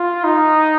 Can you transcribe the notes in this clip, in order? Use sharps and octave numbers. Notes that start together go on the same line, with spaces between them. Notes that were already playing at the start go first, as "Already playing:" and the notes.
Already playing: F4
D#4